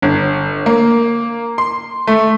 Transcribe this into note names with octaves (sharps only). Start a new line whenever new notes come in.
G1
A#3
C6
A3